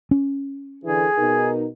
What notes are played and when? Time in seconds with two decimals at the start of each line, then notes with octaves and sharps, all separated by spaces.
0.11 C#4
0.84 D3 E3 G#4
1.17 B2 D#4 A#4